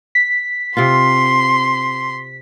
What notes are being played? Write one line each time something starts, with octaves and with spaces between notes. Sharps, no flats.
B6
C3 C4 F4 C6